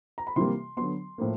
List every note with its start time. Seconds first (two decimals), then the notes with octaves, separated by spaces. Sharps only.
0.18 A#5
0.27 B5
0.36 C3 E3 G3 A#3 C6
0.77 D3 F#3 B3 C6
1.18 A2 F3 A#3